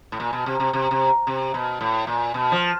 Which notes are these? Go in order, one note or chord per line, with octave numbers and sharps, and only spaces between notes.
A2
A#2
B2
C3
C3
C3
C3
C3
B2
A2
A#2
B2
F3